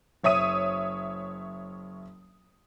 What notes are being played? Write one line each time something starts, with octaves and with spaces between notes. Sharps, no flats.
F#1 C#5 E5 D#6 D#7